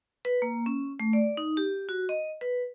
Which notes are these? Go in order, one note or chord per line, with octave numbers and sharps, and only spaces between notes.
B4
A#3
C#4
A3
D5
D#4
G4
F#4
D#5
B4